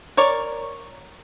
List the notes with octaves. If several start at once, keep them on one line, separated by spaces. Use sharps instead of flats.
A#4 C#5 D5